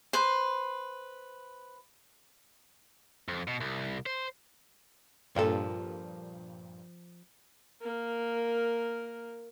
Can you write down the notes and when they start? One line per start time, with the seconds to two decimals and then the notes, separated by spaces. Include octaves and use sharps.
0.13 B4 C5
3.28 F2
3.48 B2
3.60 C2
4.06 C5
5.36 G2 A#2 F3 A4
7.81 A#3 A#4